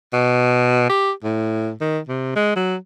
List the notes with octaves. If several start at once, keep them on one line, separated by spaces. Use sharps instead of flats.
B2
G4
A2
D#3
C3
G#3
F#3